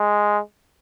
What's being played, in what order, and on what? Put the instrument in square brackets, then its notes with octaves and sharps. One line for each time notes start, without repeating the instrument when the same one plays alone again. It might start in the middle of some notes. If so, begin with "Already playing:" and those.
Already playing: [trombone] G#3